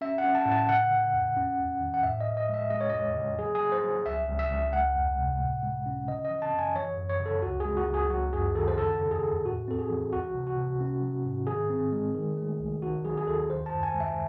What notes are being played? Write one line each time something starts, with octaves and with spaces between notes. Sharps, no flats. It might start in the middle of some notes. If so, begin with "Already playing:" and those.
C#4 E5
F#5
C#4
A5
A2
A5
C#3 F#5
C#3
E2
C#4
E2
D#3
F#5
A2 E5
D#5
A2
D#5
G#3 E5
G#3 D#5
C#5
E2 D#5
C#3
F#3 G#4
G#4
F#3
C5
F#3
C#2 E5
C#2
E5
C#2
G#3 F#5
E2
C3
A2
G#3
C#4
C#3 D#5
D#5
E3
A5
F#2
G#5
E3 C#5
F#2
C#5
C#3
A4
C#2 F#4
G#3 G#4
F#4
C#2
G#4
F#3 F#4
F#2 G#4
D#3 A4
C5
C#3 A4
E2
G#4
E2
A2 F#4
C4 A4
G#4
E3
C2 F#4
C3
F#4
C3
C#4
F#3
G#2
D#3 G#4
C4
G#3
D#3
A3
C2
D#3 F#4
F#3 G#4
G#4
D#2 A4
D#3 C5
A5
F#2
G#5
G#3
E5